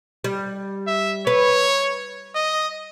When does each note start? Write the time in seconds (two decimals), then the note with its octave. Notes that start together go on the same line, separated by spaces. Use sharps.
0.24 G3
0.87 E5
1.27 B4 C#5
2.35 D#5